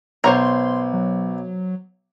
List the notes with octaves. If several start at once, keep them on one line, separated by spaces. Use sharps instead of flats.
B1 C5 C#5 A#5 C6
F#3